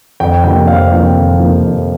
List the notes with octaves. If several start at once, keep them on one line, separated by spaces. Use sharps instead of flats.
F2 G5
C3 F3 A#3 G5
F2 F5
C3 F3 A#3 G5
F2
C3 F3 A#3
F2